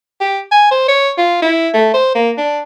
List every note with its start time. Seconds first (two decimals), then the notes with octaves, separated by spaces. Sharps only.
0.21 G4
0.52 G#5
0.71 C5
0.88 C#5
1.18 F4
1.42 E4
1.74 A3
1.94 C5
2.15 A#3
2.38 D4